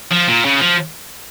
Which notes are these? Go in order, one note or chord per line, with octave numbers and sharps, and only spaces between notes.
F3
A#2
C#3
F3